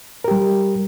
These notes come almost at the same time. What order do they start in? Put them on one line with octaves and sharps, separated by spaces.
A#4 G4 G3